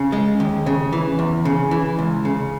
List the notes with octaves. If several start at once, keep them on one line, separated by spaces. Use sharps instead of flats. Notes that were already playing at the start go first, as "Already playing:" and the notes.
Already playing: C#3
G#3
D#2
C#3
E3
E2
C#3
E3
C#2
C#3